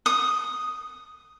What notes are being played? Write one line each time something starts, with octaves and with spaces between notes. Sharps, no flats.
D#6